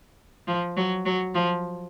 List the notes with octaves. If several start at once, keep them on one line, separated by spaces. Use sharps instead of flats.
F3
F#3
F#3
F3